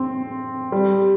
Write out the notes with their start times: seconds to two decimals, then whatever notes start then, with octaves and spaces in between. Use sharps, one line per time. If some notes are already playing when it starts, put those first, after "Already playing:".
Already playing: C4
0.72 G3